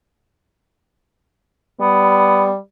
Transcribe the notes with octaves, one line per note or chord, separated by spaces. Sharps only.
G3 B3